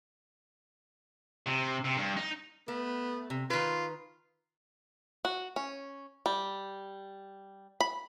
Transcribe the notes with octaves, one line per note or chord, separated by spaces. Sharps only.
C3
C3
G2
D#4
A3 B3
C3
D#3 F4 B4
F#4
C#4
G3
B5